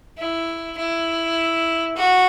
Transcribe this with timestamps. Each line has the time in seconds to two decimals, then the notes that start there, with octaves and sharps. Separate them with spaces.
0.18 E4
0.77 E4
1.96 F#4